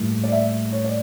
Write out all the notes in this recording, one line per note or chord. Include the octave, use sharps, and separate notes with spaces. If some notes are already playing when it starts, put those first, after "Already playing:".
Already playing: A2 G3 A#3
D5
E5
C#5
D5